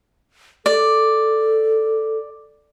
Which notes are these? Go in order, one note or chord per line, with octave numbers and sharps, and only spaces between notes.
A4 D5